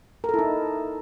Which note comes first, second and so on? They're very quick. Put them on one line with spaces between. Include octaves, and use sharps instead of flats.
A#4 A4 E4 D#4